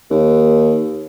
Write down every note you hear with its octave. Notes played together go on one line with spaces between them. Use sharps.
D#2